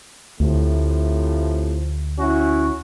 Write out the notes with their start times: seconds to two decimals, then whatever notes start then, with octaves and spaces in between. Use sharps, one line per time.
0.40 D2 A2 C3 F3
2.19 C#4 E4 F#4